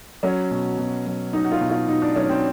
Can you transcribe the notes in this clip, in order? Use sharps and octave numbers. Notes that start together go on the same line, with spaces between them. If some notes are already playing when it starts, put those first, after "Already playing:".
F#3 C#4
B2
B2
F#3
F#3 D#4
F#4
F4
B2
F4
B2 D#4
D4
F#3 C#4
C4